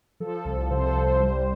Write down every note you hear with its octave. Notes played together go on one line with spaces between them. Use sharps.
F3 A4
C2
C3 C5
A4
C2
C5
G3